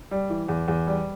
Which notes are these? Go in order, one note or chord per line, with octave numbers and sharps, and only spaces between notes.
G3
E3
E2
E2
G3